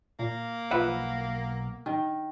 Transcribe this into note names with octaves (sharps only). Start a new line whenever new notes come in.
A#2 A#3
B1 F3 B4 E5 F#5
D#3